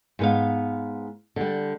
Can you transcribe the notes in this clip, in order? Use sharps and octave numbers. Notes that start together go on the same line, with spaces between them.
G#2 B3 F5
D3 G3